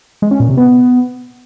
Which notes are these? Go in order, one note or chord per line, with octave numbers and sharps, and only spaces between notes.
G#3
C#4
A#2
C3
B3